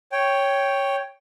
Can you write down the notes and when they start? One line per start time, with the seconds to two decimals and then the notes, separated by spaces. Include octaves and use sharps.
0.12 C#5 G5